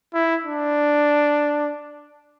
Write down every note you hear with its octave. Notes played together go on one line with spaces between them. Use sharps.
E4
D4